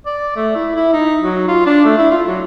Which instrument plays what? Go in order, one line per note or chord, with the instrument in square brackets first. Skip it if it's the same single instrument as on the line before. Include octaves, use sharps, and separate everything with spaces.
[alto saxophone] D5
A3
E4
E4
D#4
F#3
F4
D4
A3
E4
F4
F#3